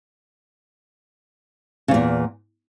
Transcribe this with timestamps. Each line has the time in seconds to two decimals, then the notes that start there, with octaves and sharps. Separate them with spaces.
1.88 C#3
1.91 E2
1.94 A#2